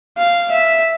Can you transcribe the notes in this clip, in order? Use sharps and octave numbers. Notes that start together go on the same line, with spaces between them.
F5
E5